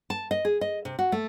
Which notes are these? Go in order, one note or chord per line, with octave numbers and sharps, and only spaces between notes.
A5
D#5
G#4
D#5
C3
F#4
A3